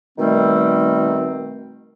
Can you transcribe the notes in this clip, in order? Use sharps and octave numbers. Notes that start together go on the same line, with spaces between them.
B2 D#3 G3 A3 C4